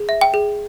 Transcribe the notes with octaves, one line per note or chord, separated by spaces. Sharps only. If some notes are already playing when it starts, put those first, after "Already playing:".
Already playing: G#4
E5
G5
G#4